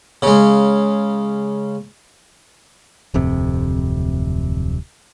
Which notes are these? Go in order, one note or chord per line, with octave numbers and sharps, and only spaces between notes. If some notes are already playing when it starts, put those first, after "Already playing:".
C#3 G#3
D1 F2 C3